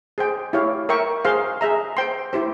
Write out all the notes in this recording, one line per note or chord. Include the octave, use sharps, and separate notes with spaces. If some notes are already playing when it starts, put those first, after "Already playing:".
G#4 C5 G5
E4 G4 C#5 F5
A#4 E5 G5 C#6
G#4 C5 F5 C6
G#4 E5 A#5
C5 G5 C6
E4 G4 C5